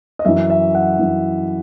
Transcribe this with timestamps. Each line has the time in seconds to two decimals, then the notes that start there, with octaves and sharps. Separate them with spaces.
0.19 D#5
0.25 F#2 E3 E5
0.50 E5
0.75 F#5
0.99 F#2 E3